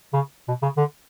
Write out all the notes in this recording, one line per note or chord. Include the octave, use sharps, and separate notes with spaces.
C#3
B2
C#3
D3